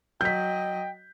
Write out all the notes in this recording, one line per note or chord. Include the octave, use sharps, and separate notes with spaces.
F#3 D#5 G5 G6 B6